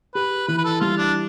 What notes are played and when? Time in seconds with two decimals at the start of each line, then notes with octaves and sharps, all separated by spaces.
0.15 G4 B4
0.48 E3 B4
0.58 B4
0.65 A4
0.81 G3 F4
0.98 D4